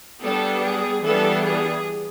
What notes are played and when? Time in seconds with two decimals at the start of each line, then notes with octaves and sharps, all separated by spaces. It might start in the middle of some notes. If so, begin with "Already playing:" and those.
0.24 G3 B3 D4 A4
0.64 G#4
1.03 E3 G3 B3 D4 A4
1.42 G#4